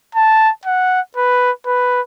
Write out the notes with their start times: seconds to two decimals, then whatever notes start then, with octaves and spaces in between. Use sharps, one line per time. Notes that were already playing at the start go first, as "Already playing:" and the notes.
0.15 A5
0.66 F#5
1.16 B4
1.66 B4